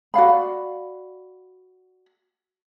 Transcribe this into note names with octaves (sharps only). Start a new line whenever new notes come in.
F#4 D5 F5 B5